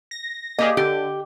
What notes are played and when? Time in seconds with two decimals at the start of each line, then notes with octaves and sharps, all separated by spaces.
0.11 A#6
0.59 A#3 G4 G#4 D#5
0.77 D3 G4